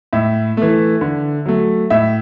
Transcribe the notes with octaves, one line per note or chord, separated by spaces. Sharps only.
A2 E5
E3 A3
D3
F#3 A3
A2 E5